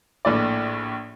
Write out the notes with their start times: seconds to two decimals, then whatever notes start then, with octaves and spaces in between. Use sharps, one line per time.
0.25 A#1 A2 D5